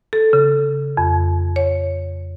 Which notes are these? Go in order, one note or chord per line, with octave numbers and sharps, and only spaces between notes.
A4
C#3
F2
C#5